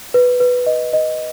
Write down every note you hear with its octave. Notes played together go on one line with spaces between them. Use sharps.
B4
B4
D#5
D#5